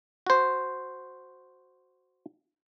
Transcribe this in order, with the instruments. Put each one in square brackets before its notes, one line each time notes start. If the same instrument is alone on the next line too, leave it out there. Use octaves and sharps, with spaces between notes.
[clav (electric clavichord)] F#4 C5